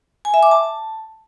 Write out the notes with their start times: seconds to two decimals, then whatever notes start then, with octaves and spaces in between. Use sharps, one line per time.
0.25 G#5
0.34 E5
0.43 D6
0.51 A5